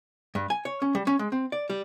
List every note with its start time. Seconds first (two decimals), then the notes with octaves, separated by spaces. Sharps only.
0.35 G2
0.50 G#5
0.65 C#5
0.82 C#4
0.95 G3
1.07 C#4
1.19 G#3
1.32 C4
1.52 D5
1.70 G3